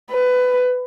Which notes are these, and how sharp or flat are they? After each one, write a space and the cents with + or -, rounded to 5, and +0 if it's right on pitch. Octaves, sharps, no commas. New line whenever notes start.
B4 +20